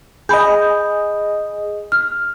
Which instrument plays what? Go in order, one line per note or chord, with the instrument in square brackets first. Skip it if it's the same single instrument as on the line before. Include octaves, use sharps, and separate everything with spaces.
[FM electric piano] G#4 D#5 [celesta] G#5 B5 G6
[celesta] F6